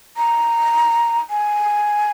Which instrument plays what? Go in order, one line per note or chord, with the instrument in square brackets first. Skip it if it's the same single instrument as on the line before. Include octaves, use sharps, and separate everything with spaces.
[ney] A#5
G#5